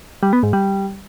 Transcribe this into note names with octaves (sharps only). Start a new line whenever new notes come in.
G3
B3
G#2
G3